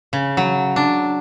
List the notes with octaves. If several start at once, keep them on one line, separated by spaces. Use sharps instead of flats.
C#3
F#3
D4